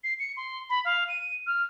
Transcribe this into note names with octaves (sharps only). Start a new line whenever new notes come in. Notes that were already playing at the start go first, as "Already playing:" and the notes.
C7
C#7
C6
B5
F5
D#7
F6